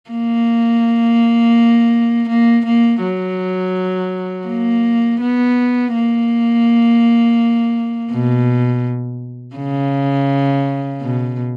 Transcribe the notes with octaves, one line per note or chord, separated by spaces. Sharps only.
A#3
A#3
A#3
F#3
A#3
B3
A#3
B2
C#3
B2